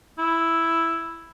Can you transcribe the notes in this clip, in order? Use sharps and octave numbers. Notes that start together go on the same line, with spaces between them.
E4